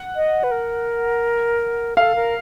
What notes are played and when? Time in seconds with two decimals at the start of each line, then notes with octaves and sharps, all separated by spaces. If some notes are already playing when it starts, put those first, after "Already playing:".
Already playing: F#5
0.16 D#5
0.44 B4
0.51 A#4
1.97 A4 F5
2.15 A#4